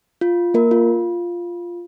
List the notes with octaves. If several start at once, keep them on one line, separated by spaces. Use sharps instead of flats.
F4
A#3 A#4
F4